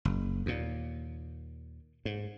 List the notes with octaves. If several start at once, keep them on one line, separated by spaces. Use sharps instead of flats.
F#1
D#2 A#2
G#2